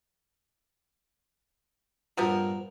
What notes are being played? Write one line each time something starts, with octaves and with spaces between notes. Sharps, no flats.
G2 A#2 F3 B3 A#4